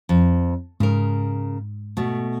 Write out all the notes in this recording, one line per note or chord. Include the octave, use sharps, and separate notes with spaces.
F2
G#2 C#3 A#4
B2 A3